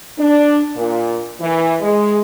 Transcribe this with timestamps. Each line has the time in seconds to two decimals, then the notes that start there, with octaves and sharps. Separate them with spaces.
0.19 D4
0.75 A#2
1.40 E3
1.81 G#3